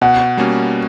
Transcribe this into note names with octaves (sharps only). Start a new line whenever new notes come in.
B2 F#5
G3 A#3 C#4 F#4